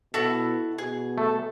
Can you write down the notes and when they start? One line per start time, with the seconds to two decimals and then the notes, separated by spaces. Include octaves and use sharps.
0.14 B2 E4 F#4 A4
0.78 B2 G#4
1.18 A3 A4